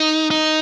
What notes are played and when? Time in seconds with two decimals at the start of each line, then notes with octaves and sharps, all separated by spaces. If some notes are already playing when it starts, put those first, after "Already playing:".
Already playing: D#4
0.31 D#4